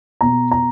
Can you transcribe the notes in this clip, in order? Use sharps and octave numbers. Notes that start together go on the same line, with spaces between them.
B2 A#5
A#5